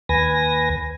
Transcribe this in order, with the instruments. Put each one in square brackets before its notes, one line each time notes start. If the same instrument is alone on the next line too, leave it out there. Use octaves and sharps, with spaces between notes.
[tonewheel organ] D#2 B4 G#5 A#6